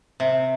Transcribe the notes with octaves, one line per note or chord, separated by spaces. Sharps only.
C3